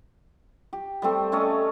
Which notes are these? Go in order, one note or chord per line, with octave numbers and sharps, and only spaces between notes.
G4
G3 A3 C4
A3 C#4 D5 D#5